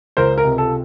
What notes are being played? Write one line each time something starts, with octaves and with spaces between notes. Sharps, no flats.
C#2 A#4 C5
A#4
C3
A4